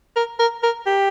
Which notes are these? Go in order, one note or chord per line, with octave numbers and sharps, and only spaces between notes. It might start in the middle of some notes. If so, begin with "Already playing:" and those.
A#4
A#4
A#4
G4